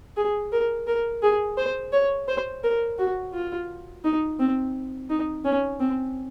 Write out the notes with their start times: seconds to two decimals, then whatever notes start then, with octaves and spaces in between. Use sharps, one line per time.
0.17 G#4
0.52 A#4
0.87 A#4
1.23 G#4
1.58 C5
1.92 C#5
2.28 C5
2.63 A#4
2.98 F#4
3.33 F4
4.04 D#4
4.39 C4
5.10 D#4
5.44 C#4
5.80 C4